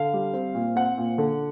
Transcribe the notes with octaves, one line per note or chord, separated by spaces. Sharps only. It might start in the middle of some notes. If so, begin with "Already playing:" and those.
Already playing: D3 F5
G3
C4
A#2
C4 F#5
A#2
D3